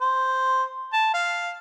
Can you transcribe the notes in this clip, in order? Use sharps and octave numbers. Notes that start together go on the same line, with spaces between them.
C5
A5
F5